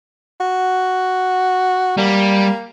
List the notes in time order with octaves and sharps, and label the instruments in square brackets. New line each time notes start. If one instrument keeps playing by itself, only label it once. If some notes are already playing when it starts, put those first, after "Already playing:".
[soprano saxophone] F#4
[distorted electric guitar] G3 [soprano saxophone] A#3